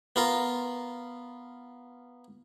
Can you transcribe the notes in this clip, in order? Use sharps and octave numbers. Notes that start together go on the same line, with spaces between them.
B3 F4 A#4